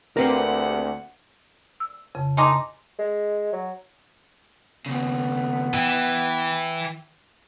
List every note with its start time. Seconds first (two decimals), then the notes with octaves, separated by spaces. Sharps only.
0.17 D2 A#3 C4 G4 A#4 B4 F5 F#5
1.80 E6
2.15 F2 C#3
2.37 A3 D#4 G#5 C6 D6
2.99 G#3
3.53 F#3
4.86 D#2 C#3 B3
5.74 E3 G5